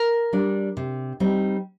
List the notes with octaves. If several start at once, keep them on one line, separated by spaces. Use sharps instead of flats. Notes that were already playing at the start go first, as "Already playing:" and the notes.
Already playing: A#4
G3 D4
C3
G3 C4 D#4